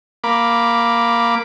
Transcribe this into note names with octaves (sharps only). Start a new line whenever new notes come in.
A#3 B5 D6